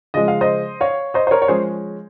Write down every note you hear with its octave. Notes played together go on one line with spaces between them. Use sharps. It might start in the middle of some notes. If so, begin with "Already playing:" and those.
C#3 F3 G#3 D#5
F5
C5 D#5
C#5 F5
C5 D#5
C5
A#4 C#5
C#5
F3 G#3 C#4 G#4 C5